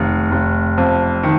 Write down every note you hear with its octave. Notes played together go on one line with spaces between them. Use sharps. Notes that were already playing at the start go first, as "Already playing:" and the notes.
Already playing: F1 D#3
F1
F2
D#3